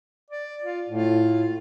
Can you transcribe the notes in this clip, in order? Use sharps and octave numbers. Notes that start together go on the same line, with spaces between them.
D5
F4
A2 F4